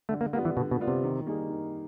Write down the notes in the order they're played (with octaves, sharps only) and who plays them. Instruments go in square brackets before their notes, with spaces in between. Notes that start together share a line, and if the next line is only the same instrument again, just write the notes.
[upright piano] D3 [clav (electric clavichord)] A3
[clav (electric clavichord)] A#3
[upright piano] G3 B3 D4 F4 [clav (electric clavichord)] A#3
[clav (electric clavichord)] E3
[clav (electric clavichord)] B2 [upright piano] D3
[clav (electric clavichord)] B2
[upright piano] G3 B3 D4 F4
[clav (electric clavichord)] C3
[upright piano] D#3
G3 A#3 D#4 G#4
D#3